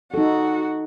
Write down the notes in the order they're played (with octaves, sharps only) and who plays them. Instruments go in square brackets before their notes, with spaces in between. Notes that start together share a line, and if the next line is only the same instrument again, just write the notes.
[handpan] D#4 A4 [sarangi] F#4